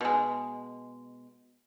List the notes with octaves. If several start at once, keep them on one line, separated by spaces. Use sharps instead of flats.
B2 G#3